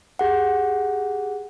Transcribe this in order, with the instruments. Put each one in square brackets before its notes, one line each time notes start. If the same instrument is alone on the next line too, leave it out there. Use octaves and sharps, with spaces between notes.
[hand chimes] G4 G#4 F#5